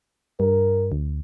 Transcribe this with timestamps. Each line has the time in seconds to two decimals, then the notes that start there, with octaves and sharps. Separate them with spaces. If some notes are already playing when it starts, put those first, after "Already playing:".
0.40 G2 A#4
0.92 D2